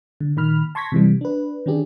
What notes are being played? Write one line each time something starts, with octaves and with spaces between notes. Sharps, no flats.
D3
A#2 D#3 B5 F6
A5 C6 C#6 G#6 A#6 B6
C3 E3 G3
D4 B4
D#3 C#4 D4 G4 G#4